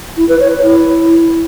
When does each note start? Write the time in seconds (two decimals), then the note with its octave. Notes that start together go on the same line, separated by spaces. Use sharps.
0.17 E4
0.29 B4
0.40 C#5
0.51 C#5
0.63 E4